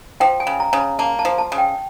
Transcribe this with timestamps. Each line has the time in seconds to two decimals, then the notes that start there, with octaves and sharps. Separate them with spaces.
0.20 F3 G5
0.40 G#5
0.47 C#3
0.60 A#5
0.73 C#3
0.80 A#5
0.99 A#3 A5
1.19 A5
1.25 F3
1.38 A5
1.52 C#3
1.58 G5